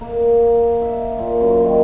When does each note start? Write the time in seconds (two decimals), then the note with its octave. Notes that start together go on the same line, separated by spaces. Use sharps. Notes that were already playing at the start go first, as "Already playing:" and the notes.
0.01 A#3
0.82 E5
1.19 A#2
1.41 F#2
1.64 D#3